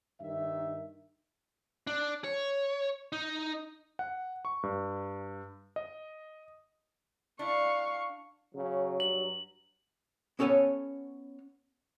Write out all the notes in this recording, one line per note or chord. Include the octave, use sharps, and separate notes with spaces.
G2 D#3 E5
D4
C#5
D#4
F#5
C#6
G2
D#5
D4 E4 F5 C#6
C#3 F#3
G2 F#7
B3 C#4 A4 C#5 F#5 G#5